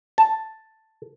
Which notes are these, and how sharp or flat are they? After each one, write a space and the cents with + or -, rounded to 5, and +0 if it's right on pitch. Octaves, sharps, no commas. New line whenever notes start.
A5 +5